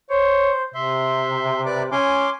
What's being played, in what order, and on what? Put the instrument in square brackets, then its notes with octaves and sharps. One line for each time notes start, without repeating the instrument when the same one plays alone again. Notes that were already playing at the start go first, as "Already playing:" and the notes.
[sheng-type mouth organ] C5 [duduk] C#5
[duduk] C3 [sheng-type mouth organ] E5 C6
[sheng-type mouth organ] B4 D5 D6
[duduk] C#4 [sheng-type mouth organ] G#5 C6 D6